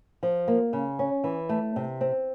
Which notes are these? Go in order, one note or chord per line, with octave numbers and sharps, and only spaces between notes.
F3
A#3
C#3
C#4
E3
A3
C3
C4